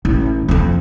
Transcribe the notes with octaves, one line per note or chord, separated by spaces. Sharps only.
A1
F2 F3